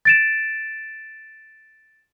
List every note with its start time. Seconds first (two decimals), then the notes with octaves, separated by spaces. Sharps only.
0.05 A6 D7 E7